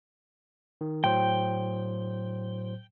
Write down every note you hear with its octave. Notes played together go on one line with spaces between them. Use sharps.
D#3
A2 F#3 C5 G5